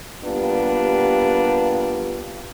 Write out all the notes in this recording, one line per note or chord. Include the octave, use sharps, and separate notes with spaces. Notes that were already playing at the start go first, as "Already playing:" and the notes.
G3 A#3 B3 D4 F4 G4